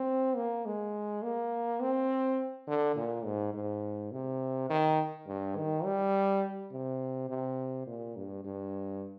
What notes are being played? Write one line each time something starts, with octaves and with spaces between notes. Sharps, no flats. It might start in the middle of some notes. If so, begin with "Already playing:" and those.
Already playing: C4
A#3
G#3
A#3
C4
D3
A#2
G#2
G#2
C3
D#3
G2
D#3
G3
C3
C3
A#2
G2
G2